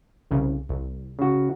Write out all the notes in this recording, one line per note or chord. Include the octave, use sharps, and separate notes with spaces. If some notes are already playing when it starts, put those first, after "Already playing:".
C2 C#3
C2
C#3 F#4